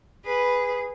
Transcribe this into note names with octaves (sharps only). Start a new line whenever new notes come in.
G#4 B4